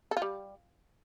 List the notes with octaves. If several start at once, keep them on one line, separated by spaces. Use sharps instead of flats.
A4
F4
G3